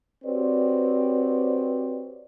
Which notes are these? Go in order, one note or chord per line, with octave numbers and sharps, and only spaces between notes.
C4 F#4 G4 B4 C#5 D5